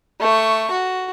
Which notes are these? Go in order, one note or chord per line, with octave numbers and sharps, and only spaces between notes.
A3 C#6
F#4